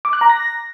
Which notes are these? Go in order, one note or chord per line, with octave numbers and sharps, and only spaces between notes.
D6
F#6
A#5
A#6